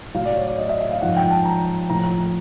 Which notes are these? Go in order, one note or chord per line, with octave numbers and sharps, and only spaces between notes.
A2 F#3 F5
D5
C#5
D5
D#5
E5
E5
F5
G#2 F3 F#5
G5
A5
A#5
A2 F3 A#5